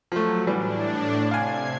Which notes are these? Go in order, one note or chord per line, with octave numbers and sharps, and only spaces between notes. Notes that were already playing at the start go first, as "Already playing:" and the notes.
F3 F#3 A3
A2 E3 G3 D4
C3 F5 G#5 G#6 C7